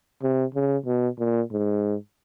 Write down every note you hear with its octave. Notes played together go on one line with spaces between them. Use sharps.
C3
C#3
B2
A#2
G#2